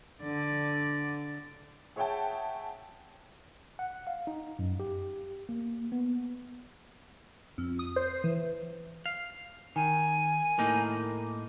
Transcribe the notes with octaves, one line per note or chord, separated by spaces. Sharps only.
D3 D5
G#4 C#5 E5 F#5 G5 A5
F#5
F5
D#4
F#2
G4
A#3
B3
F2
D#6
C5
E3
F5
D#3 G#5
A2 A#3 D#4